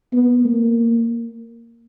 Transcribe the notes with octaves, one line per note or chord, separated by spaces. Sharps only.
B3
A#3